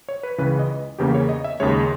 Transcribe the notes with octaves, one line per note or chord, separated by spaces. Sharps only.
C#5
B4
C#2 C#3 E3 B4
D#5
E2 C#3 E3 A#3 C#4 G4
C#5
D#5
E5
D#2 C#3 G#3 C#5